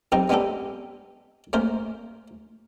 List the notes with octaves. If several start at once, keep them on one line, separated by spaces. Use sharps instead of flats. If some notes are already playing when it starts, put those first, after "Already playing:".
B1 C4 D#4 G4 A#5
G#3 B3 C#4 D4 G4 A4
A3 A#3 C#4 A#4 C5